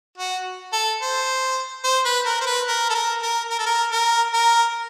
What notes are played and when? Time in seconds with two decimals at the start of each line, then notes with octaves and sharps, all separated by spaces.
0.18 F#4
0.73 A4
1.02 C5
1.84 C5
2.05 B4
2.26 A#4
2.41 C5
2.46 B4
2.67 A#4
2.90 A4
2.95 A#4
3.22 A#4
3.50 A#4
3.59 A4
3.66 A#4
3.92 A#4
4.34 A#4